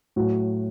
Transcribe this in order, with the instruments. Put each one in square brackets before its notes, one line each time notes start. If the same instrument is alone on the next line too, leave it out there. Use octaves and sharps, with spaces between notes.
[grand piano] A2 F#3 F#4